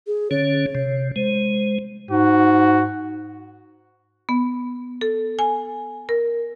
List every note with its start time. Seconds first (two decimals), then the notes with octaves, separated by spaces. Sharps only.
0.07 G#4
0.31 D3 C#4 C#5
0.75 C3
1.16 G#3 C5
2.11 G#2 F#4
4.29 B3
5.01 A4
5.39 G#5
6.09 A#4